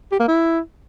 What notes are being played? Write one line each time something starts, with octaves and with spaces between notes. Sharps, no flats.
G4
A#3
E4